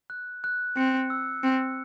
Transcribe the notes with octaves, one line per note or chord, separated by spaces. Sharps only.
F#6
F#6
C4 C#7
E6
C4 C#7